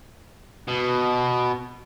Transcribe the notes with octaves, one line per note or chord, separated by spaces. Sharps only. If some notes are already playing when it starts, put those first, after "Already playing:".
B2